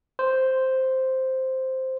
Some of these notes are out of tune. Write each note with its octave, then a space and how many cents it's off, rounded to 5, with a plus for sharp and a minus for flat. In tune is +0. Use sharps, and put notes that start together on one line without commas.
C5 +0